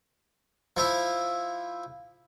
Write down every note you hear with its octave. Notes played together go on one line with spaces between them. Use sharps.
F3 E4